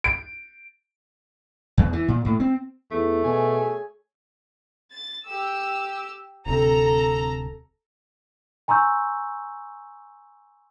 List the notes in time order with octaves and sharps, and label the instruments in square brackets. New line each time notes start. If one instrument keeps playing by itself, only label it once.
[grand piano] D7
[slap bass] E2
E3
A#2
A2
C4
[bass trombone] E2 [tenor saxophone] A3
[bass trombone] B2 [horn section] G#4 C#5 G#5
[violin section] A6
G4 E6
[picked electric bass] D1 C3 [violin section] A4 A#5
[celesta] G#5 A#5 C6 C#6 E6 G6